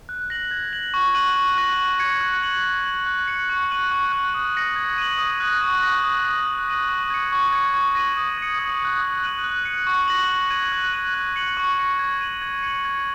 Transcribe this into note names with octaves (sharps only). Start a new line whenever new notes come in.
F#6
A#6 F#7
G#6
F#7
C#6
F#6 D#7 F#7
C#6
F#6 A#6 D#7
C#6
G#6 C#7
F#6
C#7 F#7
G#6
F#7
F#6
C#7 F#7
C#6
F#6 D#7 F#7
C#6
F#6 D#7 F#7
D#6
A#6 C#7 F#7
G#6
D#7 F#7
D#6
F#6 A#6 F#7
C#6
A#6 D#7 F#7
D#6
A#6 F#7
F#6
A#6 D#7 F#7
C#6
G#6 C#7
C#6
G#6 C#7
C#6
A#6 D#7 F#7
D#6
G#6 C#7
D#6
F#6 C#7
D#6
F#6 D#7 F#7
F#6
C#7 F#7
C#6
A#6 F#7
C#6
G#6 D#7 F#7
F#6
D#7 F#7
F#6
C#7 F#7
C#6
A#6 C#7 F#7
G#6
D#7 F#7
G#6
C#7 F#7
G#6